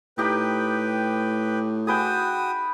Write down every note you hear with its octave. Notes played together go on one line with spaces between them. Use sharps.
A2 D#4 G4 B4 G5
F#4 G#4 B4 G5 D#6